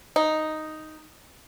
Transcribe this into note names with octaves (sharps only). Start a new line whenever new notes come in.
D#4